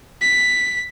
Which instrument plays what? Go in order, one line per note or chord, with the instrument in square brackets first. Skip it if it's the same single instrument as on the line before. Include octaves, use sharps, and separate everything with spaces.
[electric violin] B6